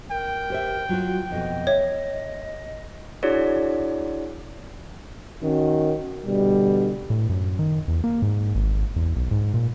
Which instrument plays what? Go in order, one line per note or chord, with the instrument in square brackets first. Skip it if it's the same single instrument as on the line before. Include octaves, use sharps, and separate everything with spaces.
[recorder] A#4 [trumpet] G5
[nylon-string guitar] G4 C5 E5
[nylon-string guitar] F#3 F#4 [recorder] F4
[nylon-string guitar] F2 B2 [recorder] D#5
[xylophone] C#5 [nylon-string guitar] E5
[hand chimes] D4 E4 F#4 G#4 C#5 D5
[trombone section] D#3 C#4 F#4
B2 D3 G3
[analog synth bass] A2
F#2
D#3
E2
A#3
G#2
G#1
E2
B1
G#2
A#2